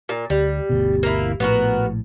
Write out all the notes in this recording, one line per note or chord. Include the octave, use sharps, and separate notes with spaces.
A#2
D2 G3
G1 D2 B2
A#3 E4
A#1 A2 B3 F#4 A#4